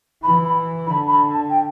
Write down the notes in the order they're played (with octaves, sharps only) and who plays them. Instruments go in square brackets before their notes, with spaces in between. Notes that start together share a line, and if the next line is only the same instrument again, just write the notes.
[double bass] E3 [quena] B5
[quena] B5
[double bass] D3 [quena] B5
[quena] B5
A5
G5